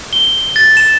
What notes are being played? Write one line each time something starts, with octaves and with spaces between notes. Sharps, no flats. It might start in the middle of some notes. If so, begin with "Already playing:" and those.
G7
A6
E7